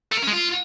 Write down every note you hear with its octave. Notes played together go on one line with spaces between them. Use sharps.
A3
A#4
C#4
G#3
F4